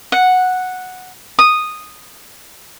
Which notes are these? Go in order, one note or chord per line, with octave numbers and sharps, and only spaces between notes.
F#5
D#6